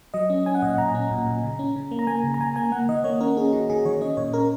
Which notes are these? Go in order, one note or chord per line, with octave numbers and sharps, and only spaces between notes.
F#3 D#5
C#4
C#4 G#5
F#5
A#2 D#5
F#5
A#2 A#5
C#4
A#2
A#2
C#3
C#4
C#3
A#3
A#5
A#3 G#5
C#3
A#5
C#3 G#5
A#3 G#5
A#3 F#5
D#3 D#5
A#3 C#5
C#4 A#4
C#4 G#4
D#3 F#4
D#3 G#4
D#3 C#5
C#4 D#5
A#2 C#5
C#4 A#4